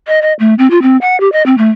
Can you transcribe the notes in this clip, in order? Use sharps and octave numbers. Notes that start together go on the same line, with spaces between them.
D#5
D#5
A3
C4
F4
C4
F#5
G4
D#5
C4
A3